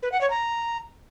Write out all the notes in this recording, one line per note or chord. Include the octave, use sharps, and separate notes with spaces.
B4
F#5
C#5
A#5